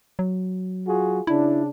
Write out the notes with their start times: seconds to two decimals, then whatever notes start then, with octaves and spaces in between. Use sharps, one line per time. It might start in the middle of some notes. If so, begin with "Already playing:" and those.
0.19 F#3
0.86 F4 F#4 G#4
1.27 C#3 D4 E4